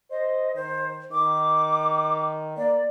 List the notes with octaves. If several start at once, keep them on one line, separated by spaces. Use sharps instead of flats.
C5 D#5
D#3 C5
D#3 D6
A#3 D5